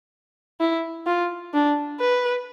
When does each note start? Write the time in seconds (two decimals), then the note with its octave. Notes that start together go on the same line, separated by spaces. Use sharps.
0.60 E4
1.06 F4
1.53 D4
2.00 B4